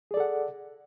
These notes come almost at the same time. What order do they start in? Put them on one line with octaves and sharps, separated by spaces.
G#4 D5 A4 F#5